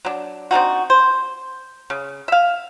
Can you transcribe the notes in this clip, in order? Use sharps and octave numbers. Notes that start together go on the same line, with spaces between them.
F#3 D4
C4 D4 D#4 F#4
C5
C#3
E5 F5